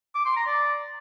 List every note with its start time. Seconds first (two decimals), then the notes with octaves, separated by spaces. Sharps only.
0.15 D6
0.25 C6
0.36 A#5
0.47 D5